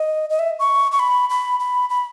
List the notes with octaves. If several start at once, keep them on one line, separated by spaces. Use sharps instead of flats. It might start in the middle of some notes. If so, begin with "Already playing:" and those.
Already playing: D#5
D#5
E5
C#6
C#6
B5
B5
B5
B5